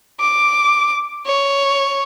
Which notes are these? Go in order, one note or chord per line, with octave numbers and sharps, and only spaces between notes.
D6
C#5